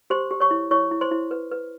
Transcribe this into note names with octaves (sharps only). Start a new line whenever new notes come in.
G4 C5 C6
G4
C#5 C#6
E4
E4 C#5 C#6
E4
C5 C6
E4
B4
B4